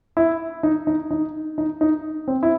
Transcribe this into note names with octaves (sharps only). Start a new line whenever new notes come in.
E4
D#4
D#4
D#4
D#4
D#4
C4
E4